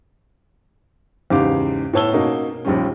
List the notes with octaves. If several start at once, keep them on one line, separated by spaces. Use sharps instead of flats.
E2 G#2 C#3 G4 F5 D6
A2 B3 C#5 A5 E6 G7
B2 A#3 C#4 D#4
A#1 D#2 G3 C#4